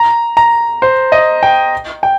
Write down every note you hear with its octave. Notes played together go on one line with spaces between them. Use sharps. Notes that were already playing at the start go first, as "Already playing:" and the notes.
Already playing: A#5
A#5
C5
D#5
G5
G5